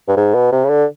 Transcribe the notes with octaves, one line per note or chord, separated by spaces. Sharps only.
G2
G#2
B2
C3
C#3
D3